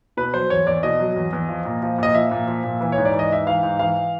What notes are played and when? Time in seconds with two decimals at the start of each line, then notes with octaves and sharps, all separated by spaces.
0.17 B2 B4
0.34 F#3 C5
0.50 E2 C#5
0.67 E2 D5
0.83 B2 D#5
1.00 F#3
1.16 E2
1.33 E2
1.49 F3
1.65 A#2
1.82 F3
1.98 A#2 D#5
2.15 F3 E5
2.31 A#2
2.48 F3
2.64 A#2
2.81 E3
2.92 C#5
2.98 G#2
3.05 D5
3.14 E3
3.19 D#5
3.30 G#2 E5
3.47 E3 F5
3.63 G#2
3.79 E3 F5